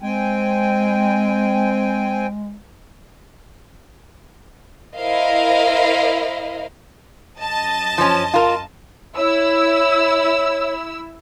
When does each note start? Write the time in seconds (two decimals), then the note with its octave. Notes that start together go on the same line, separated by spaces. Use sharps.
0.02 G#3 C4 G5 G#5
4.97 E4 A#4 C5 D#5 F5
7.39 F#2 D#5 A5
7.98 F3 C#4
8.34 F4 A#4
9.17 E4 C#5 E6